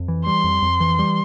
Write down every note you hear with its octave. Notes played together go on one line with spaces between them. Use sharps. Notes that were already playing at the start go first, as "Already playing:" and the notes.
Already playing: F2
E3
G3 C6
F2
F2
E3
G3